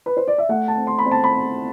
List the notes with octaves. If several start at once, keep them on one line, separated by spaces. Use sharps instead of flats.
B4
C5
D5
E5
A3 F#5
A5
C4
C6
B5
C4
A5
B5
C4